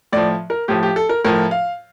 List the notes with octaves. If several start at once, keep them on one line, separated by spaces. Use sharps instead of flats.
A2 F3 D5
A#4
A2 F3 G4
G4
A4
A#4
A2 F3 A#4
F5